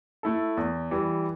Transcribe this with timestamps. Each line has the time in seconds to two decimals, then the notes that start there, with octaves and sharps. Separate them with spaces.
0.23 A3 E4 A4
0.57 E2
0.91 E3 G3